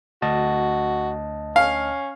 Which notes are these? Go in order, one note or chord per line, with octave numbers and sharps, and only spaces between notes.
D2 F#4 D#5 A5
C#4 F5